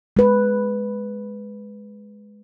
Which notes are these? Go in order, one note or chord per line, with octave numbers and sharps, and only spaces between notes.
G#3 B4